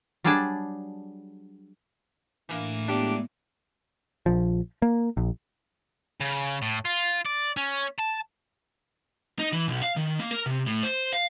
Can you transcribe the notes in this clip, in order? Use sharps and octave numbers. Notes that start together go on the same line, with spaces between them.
F#3 G3 D4 G#4 G5 A5
A2 E3 A#3 D4
A2 G#3 B3 D4 G4 D5
A#1 F3
A#3
A#1
C#3
A2
F4
D5
C#4
A5
D#4
E3
B1
F5
D#3
A#3
A#4
C3
A2
C5
F5